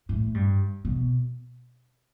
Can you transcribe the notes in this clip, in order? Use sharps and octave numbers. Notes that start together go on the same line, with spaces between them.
A2
G2
B2